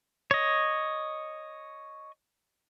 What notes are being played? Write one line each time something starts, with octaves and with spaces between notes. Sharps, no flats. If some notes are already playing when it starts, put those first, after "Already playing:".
C#5 D#5